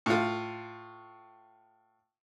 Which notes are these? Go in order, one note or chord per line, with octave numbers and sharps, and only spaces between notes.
A2 F4